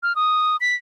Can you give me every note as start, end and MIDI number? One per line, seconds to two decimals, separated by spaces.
0.03 0.15 89
0.16 0.57 87
0.60 0.75 95